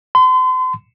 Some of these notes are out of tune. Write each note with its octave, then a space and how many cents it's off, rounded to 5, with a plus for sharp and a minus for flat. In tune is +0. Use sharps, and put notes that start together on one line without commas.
C6 -40